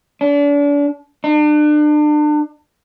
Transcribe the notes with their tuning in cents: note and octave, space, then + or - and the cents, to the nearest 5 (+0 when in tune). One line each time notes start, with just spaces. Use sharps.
D4 -35
D4 +35